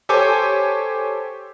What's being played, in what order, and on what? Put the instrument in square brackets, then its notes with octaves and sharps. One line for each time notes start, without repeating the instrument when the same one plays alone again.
[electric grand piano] G4 A4 C5 C#5 G#5 D6